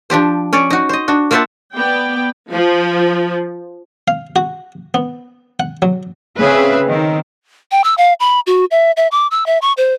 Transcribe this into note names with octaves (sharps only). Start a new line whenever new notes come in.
F3 D4 G4 C5
C#4 C#5 D5
D#4 F#4
C5 D#5
D4 F#4
A#3 F4 C5 E5 F#5 A5
B3 D5 G5
F3
F5
F#4
B3
F#5
F#3
C#3 C4 C#4 G#4 B4 E5
D#3 C4
G5
E6
F5
B5
F#4
E5
E5
D6
E6
E5
C#6
C5